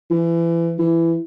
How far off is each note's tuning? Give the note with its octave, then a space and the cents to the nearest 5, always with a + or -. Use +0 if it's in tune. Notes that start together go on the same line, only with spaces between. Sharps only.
E3 +25
E3 +15